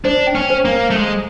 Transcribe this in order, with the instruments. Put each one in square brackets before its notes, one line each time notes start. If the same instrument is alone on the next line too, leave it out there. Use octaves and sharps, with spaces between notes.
[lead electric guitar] D4 [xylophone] C5
[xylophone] G5
[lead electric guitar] C#4
[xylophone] C5
[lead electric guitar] A#3
[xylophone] C5
[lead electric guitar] A3
[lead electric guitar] G#3 [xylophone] C5